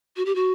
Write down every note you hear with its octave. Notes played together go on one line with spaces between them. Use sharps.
F#4
G4
F#4